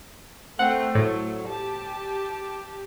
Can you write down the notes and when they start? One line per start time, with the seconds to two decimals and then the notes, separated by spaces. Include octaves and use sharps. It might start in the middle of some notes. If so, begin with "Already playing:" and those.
0.59 A3 C4 F#5
0.95 A2 F#3
1.48 G4 A5